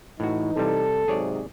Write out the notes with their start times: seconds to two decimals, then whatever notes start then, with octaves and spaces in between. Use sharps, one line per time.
0.20 A2 E3 D#4 F#4
0.57 C3 G3 A4
1.08 G#2 C3 F#3 G#4 C#5 D5